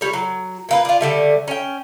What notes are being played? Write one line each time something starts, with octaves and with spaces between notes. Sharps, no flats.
G3 C#5
F#3
A#2 A#3 B4
D4 F4
D3 G3 A3
C#4 G5